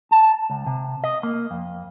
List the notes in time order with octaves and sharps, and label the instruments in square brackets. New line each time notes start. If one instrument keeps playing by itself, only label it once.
[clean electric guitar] A5
C#2
C3
D#5
A#3
F2